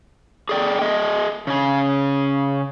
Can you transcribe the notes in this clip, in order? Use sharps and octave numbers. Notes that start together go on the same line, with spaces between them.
G#4 A4 D5 G5
G#4 D#5 E5
C#3 G#4